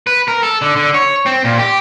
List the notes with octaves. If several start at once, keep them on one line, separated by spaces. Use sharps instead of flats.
B4
A#4
A4
D3
D3
C#5
C4
A#2
G4